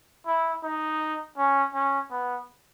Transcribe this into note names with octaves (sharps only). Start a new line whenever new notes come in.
E4
D#4
C#4
C#4
B3